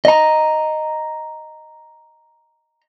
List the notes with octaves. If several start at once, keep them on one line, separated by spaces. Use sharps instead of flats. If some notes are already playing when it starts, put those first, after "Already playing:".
D#5 A#5